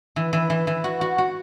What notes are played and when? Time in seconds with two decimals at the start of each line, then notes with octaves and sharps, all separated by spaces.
0.16 E3
0.33 E3
0.50 E3
0.67 E3
0.84 F#4
1.01 F#4
1.18 F#4